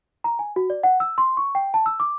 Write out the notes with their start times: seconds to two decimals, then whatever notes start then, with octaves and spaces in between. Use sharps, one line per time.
0.24 A#5
0.39 G#5
0.56 F#4
0.70 D5
0.83 F#5
1.00 E6
1.18 C6
1.37 C#6
1.55 G5
1.74 A5
1.86 E6
2.00 D6